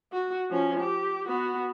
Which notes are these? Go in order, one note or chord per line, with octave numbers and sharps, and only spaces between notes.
F#4
F3 C#4
G4
B3 F#4